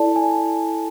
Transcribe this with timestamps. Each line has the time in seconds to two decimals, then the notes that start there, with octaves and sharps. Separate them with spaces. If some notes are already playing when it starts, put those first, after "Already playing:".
Already playing: E4 A4 D5 A5
0.16 G#5